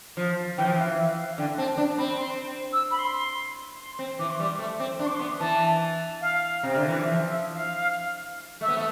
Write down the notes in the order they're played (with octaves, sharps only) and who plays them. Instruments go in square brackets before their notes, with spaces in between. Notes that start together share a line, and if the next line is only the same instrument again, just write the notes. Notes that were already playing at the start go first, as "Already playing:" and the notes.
[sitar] F3
[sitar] E3 [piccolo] G5
[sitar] F3
E3
[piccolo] F5
E5
F5
[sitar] D3 [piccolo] G5
[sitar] C4 [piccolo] A5
[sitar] D4
[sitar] C4 [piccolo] B5
[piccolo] C6
E6
B5
C6
C6
[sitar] C4
[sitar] E3 [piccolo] D6
[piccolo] C6
[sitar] G3 [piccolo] D6
[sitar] A3 [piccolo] D6
[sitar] C4
[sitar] D4 [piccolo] C6
[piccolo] D6
C6
[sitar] B3
[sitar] E3 [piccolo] A5
[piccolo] F5
[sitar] C3
D3
E3
[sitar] F3 [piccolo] E5
[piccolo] E5
F5
[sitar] A3 [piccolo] E5
[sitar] B3
A3